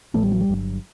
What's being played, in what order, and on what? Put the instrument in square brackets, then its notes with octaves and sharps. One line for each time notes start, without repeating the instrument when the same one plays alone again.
[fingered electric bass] A1 A2 E3 B3 [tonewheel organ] A3
[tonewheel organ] G3
F#3
G3
[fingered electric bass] G1 G2 F#3